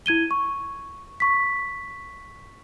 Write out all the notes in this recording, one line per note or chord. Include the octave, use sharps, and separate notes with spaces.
E4 G#6 D#7 G7
C#6
C#6 B6